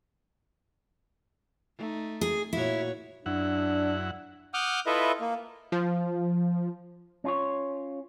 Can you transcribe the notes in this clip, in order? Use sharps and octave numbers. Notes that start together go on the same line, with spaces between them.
A3 D#4
G#4
A#2 E4 F#4 C#5
F#2 D4 E4 F#5
F#5 D6 D#6 F6 G6
E4 F4 A4 B4 D#5 E5
A#3
F3
C#4 F4 C#5